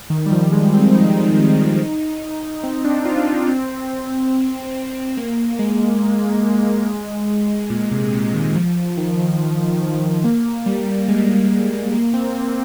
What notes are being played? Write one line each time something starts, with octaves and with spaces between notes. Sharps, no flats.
D#3
G3
F3
G#3
C4
D#4
D#4
C4
D4
F4
D4
D#4
C4
A#3
G#3
A#2
C3
C3
D#3
F3
D#3
A#3
G3
G#3
G3
G#3
A#3
C4
A#3